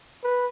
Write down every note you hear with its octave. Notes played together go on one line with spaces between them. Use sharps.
B4